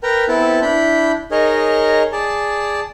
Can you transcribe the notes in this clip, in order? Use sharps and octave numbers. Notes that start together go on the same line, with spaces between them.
A#4 B4 G5 A#5
B3 C4 E4 A4 A5
D4 E4 B5 G6
D#4 G#4 A#4 C#5 D#5
G#4 D5 A5